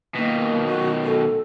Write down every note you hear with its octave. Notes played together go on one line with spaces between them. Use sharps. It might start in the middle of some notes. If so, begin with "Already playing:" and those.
B2 D#3 A#3
F#4
A4